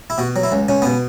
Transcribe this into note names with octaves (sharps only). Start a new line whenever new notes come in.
E4
B2 F#4
F#3
E4
C#2
C#2 C#4
B2 B3